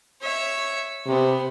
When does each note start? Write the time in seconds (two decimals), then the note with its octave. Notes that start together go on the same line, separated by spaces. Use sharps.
0.21 C#5 E5
1.06 C3 B3 C5